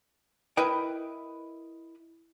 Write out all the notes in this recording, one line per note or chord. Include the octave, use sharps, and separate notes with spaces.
E4 A#4 B4 D#5 G5